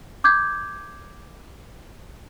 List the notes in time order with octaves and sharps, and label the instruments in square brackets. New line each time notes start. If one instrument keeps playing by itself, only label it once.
[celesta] D6 G6 G#6